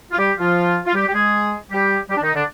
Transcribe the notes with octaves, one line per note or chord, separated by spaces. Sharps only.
F4
G3 G4
F3 F4
F4
G3 G4
G4
G#3 G#4
G3 G4
G3 G4
D4
D#3 D#4
D3 D4